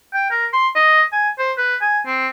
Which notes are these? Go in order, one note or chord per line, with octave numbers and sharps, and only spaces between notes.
G5
A#4
C6
D#5
G#5
C5
B4
G#5
C4